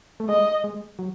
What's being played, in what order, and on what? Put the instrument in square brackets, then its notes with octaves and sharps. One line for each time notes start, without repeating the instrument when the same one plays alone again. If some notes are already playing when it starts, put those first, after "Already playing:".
[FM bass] A3
[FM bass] G#3 [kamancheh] D#5
[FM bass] G#3
F#3